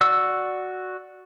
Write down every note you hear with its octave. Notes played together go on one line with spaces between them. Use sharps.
F#4 D5 E6